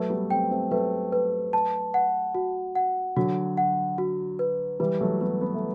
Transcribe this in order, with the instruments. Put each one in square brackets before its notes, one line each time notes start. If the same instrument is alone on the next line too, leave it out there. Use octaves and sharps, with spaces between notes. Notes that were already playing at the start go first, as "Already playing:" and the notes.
Already playing: [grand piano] F#3 A3 [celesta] B4
[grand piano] G3 B3
[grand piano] A3 C4 [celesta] G5
[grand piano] A3 C4
[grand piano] F#3 A3 [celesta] B4
[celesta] B4
A5
F#5
F#4
F#5
[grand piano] D3 F#3 [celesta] F#4
[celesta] F#5
F#4
B4
[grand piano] E3 G3 [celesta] B4
[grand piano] F#3 A3
[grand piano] G3 B3 [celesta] B4
[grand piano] B3
A3